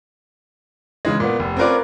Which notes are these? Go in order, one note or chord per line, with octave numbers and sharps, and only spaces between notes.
C#3 E3 G#3
A#2 B3
F1
C4 C#4 F4 A#4 B4 D5